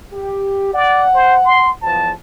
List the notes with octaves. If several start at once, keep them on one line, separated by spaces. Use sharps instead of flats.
G4
D5 F#5
C5
C6
E2 F3 A5